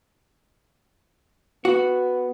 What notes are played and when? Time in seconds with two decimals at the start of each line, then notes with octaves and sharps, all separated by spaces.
1.65 B3 F#4